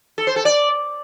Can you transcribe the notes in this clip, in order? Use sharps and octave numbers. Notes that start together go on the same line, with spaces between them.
A4
C5
A4
D5